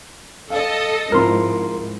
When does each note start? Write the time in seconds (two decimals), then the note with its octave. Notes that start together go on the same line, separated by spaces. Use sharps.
0.50 A4 D#5 F5
1.12 G#2 F3 C4 E4 A#4 C6